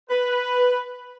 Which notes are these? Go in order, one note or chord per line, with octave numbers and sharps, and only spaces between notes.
B4